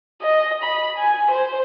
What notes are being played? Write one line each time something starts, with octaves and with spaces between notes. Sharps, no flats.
D#5
B5
G#5
C5